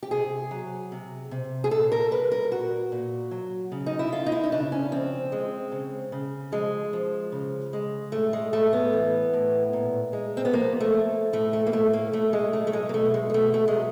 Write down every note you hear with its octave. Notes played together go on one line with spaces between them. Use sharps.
G4
C3 G#4
F#3
C3
C3
G#4
A#2 A4
A#4
G3 B4
A#4
A#2 F#4
A#2
F#3
C#3
D#4
E4
C#3 F4
D#4
E4
D#4
C#3 D4
C#4
F3 C4
G#3
C#3
C#3
F3 G#3
F3
C#3
G#3
A2 A3
G#3
A2 A3
B3
E3
A2
A#2
G#3
C4
B3
F3 A#3
A3
F3
A2 A3
A3
A#3
A2 A3
A#3
A2 A3
G#3
F#3 A3
A3
G#3
A#3
B2 A3
G#3
G#3
B2 A3
A3
G#3
F#3